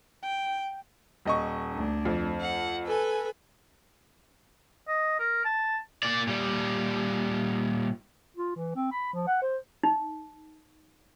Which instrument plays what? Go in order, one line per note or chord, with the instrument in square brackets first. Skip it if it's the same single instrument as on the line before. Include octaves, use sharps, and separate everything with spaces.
[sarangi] G5
[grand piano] D#1 D#5 C#6
[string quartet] D2 D4
[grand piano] F2
[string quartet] F#5
A4 B4 G#5
[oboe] D#5
A#4
A5
[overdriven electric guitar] A#3 D5
A#2 G3
[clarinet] F4
E3
C4
B5
F3
F#5
C5
[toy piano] D#4